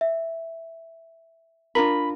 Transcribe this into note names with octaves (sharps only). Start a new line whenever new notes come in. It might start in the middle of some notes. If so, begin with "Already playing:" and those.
E5
D4 F4 A#4 B5